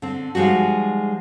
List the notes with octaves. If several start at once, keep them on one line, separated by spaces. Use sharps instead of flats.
D3 C4
F3 G3 G#3 D#4 F#4